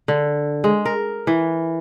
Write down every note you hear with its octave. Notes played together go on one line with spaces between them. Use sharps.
D3
G#3
A#4
E3